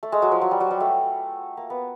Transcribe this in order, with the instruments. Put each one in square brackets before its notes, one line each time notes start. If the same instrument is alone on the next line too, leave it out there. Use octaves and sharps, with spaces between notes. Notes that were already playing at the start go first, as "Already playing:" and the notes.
[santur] A3
G#3
F#3
F3
F#3
G3
F#3
G3
A3
A#3
B3